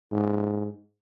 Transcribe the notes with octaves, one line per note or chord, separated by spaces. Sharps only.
G#2